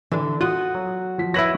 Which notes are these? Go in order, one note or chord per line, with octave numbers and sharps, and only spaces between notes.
D3 E3 D4
F4 F#4 D#6 F#6
F#3
F3 B6
E4 B4 C#5 A#6 E7 F#7